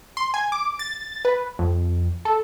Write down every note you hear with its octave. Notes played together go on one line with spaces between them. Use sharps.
C6
G#5
D6
A6
B4
F2
A4